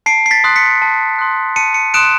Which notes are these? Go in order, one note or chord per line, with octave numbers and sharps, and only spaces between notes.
A5 C7 D7
C7
A6 B6
C6 D#6 F#6
B6 C#7
A5
C6 D#6 F#6
A5 C#7 D#7
C#7 D#7
C6 D#6 F#6 D7 E7